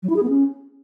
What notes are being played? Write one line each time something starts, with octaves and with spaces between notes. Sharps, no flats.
F#3
E4
G#4
B3
C#4